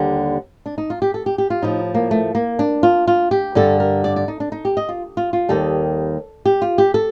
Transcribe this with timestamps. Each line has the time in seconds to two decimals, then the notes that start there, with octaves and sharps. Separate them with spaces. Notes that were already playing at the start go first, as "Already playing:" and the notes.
Already playing: D#2 D3 G3
0.66 D4
0.78 D#4
0.90 F4
1.02 G4
1.14 A4
1.26 G4
1.38 G4
1.50 F4
1.62 A2 F3 D#4
1.94 A#3
2.11 A3
2.35 A#3
2.59 D4
2.83 F4
3.08 F4
3.31 G4
3.55 G2 D3 G3 A4
3.80 A#4
4.04 D5
4.16 D5
4.28 D#4
4.40 D4
4.52 D#4
4.65 G4
4.77 D#5
4.89 F4
5.17 F4
5.33 F4
5.49 D#2 D#3 G3 A4
6.46 G4
6.62 F4
6.78 G4
6.94 A4